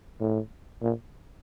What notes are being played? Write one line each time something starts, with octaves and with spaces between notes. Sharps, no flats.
A2
A#2